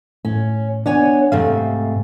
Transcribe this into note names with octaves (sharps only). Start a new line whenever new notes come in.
A2 C#4
B3 D4 C#5 G#5
G#2 C3 A3 F5